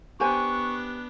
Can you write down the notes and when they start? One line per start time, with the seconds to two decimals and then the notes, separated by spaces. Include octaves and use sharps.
0.20 B3 D4 G4 C5 G#5 C#6